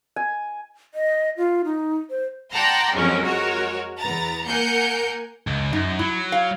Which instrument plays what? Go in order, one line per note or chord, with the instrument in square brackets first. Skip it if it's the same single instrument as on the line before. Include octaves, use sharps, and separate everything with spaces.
[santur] G#5
[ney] D#5
F4
D#4
C5
[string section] D5 F#5 G5 A5 A#5 C6
F2 F#3 G#3 C#4 A#4
G#3 F#4 A#4 C#5
E2 B3 A#5 A6
A#3 A#4 F#5 G#5 G6 C#7
[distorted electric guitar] C#2
[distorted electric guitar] F#2 [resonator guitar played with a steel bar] D#4
[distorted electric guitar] F#3 [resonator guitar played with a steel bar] E4
[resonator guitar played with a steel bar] F5